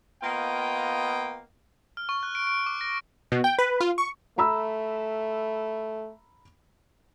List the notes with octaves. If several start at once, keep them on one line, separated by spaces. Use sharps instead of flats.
A#3 B3 F4 D#5 G5
F6
C#6
F#6
D7
D7
D6
A#6
B2
G5
B4
F4
C#6
A3 A#5 B5 E6